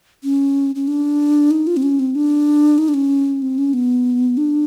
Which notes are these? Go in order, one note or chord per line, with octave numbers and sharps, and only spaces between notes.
C#4
C#4
D4
D#4
F4
C4
C#4
C4
D4
D#4
D4
C#4
C4
C#4
B3
D4